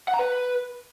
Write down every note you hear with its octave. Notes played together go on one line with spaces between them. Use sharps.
F#5
A#5
B4